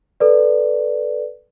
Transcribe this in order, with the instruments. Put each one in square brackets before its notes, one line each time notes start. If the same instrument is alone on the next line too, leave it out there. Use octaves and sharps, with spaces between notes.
[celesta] A4 B4 D5